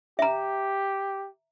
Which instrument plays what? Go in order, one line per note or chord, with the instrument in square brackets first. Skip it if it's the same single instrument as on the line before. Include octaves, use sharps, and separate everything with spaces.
[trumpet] G4 [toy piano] E5 A#5